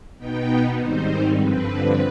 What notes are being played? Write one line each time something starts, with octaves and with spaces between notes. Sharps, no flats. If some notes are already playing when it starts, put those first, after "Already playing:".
B2 B3 D#4 G5
G#2 D#3 G3 C4 D#4 C5
G2 D3 F3 C4 B4